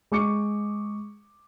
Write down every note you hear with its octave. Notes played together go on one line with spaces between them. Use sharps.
G#3 C#6 D6 C#7